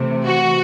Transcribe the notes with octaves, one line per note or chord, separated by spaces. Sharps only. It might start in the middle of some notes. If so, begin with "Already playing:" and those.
Already playing: C3 E3 A3
F#4